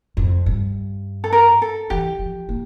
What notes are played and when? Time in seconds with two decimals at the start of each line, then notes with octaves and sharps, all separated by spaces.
0.17 F2
0.46 G2
1.24 A4
1.32 A#4
1.62 A4
1.90 E3 G4
2.19 F3
2.49 A#3